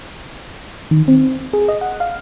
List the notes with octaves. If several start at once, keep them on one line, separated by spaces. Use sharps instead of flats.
D#3
C4
G#4
D#5
F#5
F5